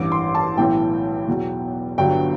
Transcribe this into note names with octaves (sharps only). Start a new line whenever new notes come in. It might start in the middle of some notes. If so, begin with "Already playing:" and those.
Already playing: A1 G2 E3 D6
C6
A5
B1 A2 E3 G5
E2 B2 F#3
G1 G2 D3 F#3 G5